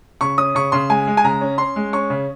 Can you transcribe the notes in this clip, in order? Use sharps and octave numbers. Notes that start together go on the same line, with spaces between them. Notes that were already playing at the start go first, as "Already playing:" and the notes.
C#3 C#6
C#4 D#6
C#3 C#6
C#3 C6
G#3 G#5
G#3
G#5
C#3 A#5
C#4
C#4 C6
G#3
C#4 C#6
C#3